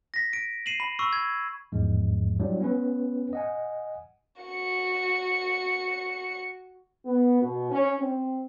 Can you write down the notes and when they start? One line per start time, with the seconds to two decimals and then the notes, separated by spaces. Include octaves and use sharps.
0.14 A#6 B6
0.33 D7
0.66 C7 D#7 E7 F#7
0.80 B5 F#7
0.99 B5 C#6 E6
1.13 G#6
1.72 E2 G#2 F3 G#3
2.40 F#3 G3 D4 E4
2.61 B3 C#4 B4
3.33 D#5 F#5 G#5
4.42 F#4 C#7
7.05 B3
7.41 B2
7.70 C#4
8.00 C4